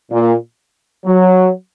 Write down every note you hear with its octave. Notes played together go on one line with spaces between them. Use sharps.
A#2
F#3